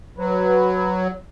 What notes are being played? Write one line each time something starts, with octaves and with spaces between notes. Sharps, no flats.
F#3 B4